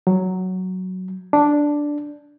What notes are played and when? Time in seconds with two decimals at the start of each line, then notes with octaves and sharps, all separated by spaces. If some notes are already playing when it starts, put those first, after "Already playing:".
0.07 F#3
1.33 D4